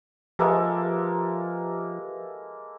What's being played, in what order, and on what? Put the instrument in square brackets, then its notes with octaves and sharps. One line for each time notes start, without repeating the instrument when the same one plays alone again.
[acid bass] F3 [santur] G#3 A#3 A4 [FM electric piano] G4 B4 E5